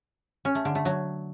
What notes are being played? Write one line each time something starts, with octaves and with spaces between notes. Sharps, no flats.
C#4
A3
D3
A3
F#3